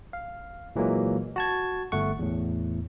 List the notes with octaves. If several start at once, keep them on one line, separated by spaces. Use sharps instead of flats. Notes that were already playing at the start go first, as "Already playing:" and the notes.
F5
A#2 E3 F#3 G#3 A#3
F#4 A5 G#6
G1 A3 F#5 C#6
E2 A2